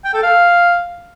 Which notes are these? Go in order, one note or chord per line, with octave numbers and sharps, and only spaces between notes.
G5
A4
F5